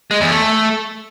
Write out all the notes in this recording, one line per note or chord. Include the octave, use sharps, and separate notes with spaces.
G#3
E2
A3